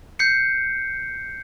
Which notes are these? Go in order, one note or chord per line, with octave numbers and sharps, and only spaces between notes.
G6 C7 C#7